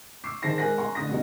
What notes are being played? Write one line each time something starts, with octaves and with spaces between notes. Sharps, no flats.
C#6 D6 E6 C7
D#3 G#4 C5 A5 A#6 C7
G#3 A#4 G#5 F#6 A#6
G#5 A#5 C6 C#6
A1 D3 D#6 A#6
B2 G3 G#3 B3 C#4 D#4